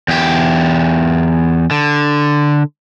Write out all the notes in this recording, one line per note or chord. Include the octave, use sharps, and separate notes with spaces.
E2 G4
D3